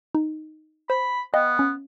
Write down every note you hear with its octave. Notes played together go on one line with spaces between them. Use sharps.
D#4
C5 B5
B3 D#5 F5 G5
C#4